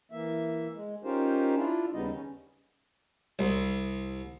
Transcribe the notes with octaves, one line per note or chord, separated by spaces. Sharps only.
E3 A#3 E5
G#3
C#4 D#4 F4 G4 A#4 C5
D4 E4 F4
D#2 C#3 G3 B3 D#4 D#5
C#4
C2